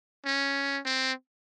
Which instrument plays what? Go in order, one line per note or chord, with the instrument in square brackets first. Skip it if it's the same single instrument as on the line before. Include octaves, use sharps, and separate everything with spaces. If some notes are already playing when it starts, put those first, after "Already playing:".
[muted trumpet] C#4
C4